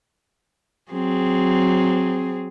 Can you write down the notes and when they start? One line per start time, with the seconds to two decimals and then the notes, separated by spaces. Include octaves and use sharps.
0.92 F#3 C4 G#4